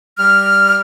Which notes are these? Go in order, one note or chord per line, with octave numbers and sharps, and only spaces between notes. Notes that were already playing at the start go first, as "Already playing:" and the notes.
G3 F6